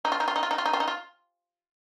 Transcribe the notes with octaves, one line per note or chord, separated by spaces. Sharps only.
D#4
F4
D#4
F4
D#4
F4
D#4
F4
D#4
F4
D#4
F4